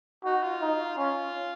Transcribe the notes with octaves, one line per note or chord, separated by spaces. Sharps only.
D#4 F#4
F4
D#4
C#4 F4